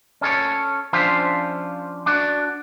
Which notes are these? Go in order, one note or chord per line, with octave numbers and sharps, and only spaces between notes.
C#4 A4 C#5
F3 C#4 D4 F4 C5 E5
D4 F#4 D5